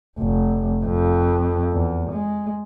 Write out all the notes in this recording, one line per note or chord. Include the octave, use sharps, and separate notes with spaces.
F1
F2
E2
G#3